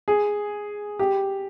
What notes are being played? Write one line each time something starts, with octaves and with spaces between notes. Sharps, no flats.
G#4
G4